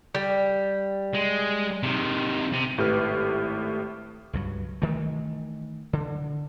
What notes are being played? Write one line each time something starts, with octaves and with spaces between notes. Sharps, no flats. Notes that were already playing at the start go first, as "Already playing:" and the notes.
G3
G#3
C3 D#3
C3
G#1 A2 G4 B4 F6
C#2 G2 F#3
D#3 E3 A3
D3